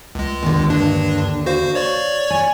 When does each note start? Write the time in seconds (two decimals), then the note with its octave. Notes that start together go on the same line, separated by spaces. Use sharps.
0.15 C#2 G#3
0.43 D#2 D3
0.70 G2 D4
1.46 F#4 C5 F5
1.75 C#5 D5 C#6
2.30 G#5